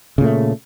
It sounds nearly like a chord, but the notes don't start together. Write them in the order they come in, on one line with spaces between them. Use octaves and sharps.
C#3 A#2 A3